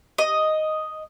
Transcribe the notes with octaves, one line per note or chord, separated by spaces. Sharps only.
D#5